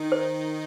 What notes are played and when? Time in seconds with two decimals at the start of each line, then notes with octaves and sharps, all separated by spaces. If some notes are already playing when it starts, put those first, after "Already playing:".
Already playing: D#3 D#4
0.12 C5